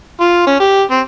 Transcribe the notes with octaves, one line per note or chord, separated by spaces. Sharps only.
F4
C#4
G4
C4